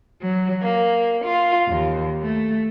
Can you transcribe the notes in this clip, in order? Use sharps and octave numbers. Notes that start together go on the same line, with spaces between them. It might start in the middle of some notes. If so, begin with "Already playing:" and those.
F#3
A#3
F4
D#2
A3